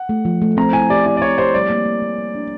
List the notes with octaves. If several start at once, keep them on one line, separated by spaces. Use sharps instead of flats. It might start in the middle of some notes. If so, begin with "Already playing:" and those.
Already playing: F#5
A3
F3
A3
C4 A#5
E4 G#5
G4 D5
E4 D5
D5
C4 C#5
G4 C5
G3 D5
A#3
A#3
A#3
G3
D4